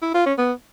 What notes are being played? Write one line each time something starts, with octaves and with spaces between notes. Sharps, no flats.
E4
F4
C#4
B3